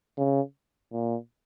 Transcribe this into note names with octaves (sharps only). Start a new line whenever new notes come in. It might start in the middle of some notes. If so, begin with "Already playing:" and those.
C#3
A#2